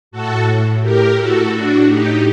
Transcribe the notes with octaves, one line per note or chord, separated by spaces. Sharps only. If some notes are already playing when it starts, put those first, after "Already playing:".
A2 F#4 A4
G4 A#4
F#4 A4
D4 F#4
D#4 G4